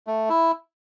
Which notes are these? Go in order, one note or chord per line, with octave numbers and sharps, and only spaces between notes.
A3
E4